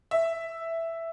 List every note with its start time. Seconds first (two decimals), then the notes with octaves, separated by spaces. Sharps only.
0.11 E5